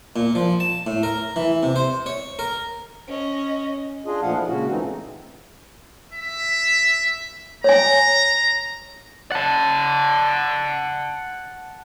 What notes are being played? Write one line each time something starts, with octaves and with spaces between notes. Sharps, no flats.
A#2
F3
A5
A2
A#4
E3
C3
C5
C#5
A#4
C#4 D#5
D4 F4 G#4 D#5
A#2 F3 A3 D4 F5 F#5
F3 E4
A#2 C#3 G#3 C#4 F#4
E3 A3 C4 D#4
E5
C#5 G#5 A#5
F#5 A5